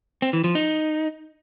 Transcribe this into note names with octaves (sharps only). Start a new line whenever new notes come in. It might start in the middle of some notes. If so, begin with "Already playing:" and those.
C4
E3
F3
D#4